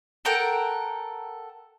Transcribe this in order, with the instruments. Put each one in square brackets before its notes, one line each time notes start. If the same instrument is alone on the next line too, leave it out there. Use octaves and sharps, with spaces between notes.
[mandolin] A4 A#4 F#5 G5